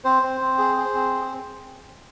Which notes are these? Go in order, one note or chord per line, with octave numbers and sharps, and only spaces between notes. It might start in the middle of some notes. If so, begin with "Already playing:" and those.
C4 C5
C4
C4
G#4
G#4
C4